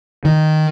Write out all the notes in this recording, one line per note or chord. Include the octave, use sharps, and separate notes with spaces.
D#3